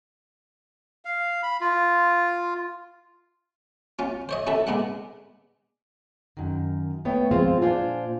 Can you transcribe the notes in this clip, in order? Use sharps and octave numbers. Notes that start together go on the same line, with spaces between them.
F5
B5
F4
C#4 F4
C5 C#5 D#5
C#4 E4 A4 E5
G#3 B3 D4 F#5
F#2 D#3
A3 B3 C#5 G5
F3 G#3 C4 F4 C5
A#2 D4 F4 C5 D5 G#5